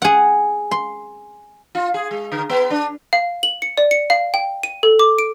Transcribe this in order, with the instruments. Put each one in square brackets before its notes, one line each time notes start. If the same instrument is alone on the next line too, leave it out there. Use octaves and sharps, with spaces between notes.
[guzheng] G#4 F#5
C6
[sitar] F4
G#4
G#3
D3
B3
D4
[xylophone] F5
F#7
C#7
D5
C#7
F5
G5
D#7
A4
D6
D7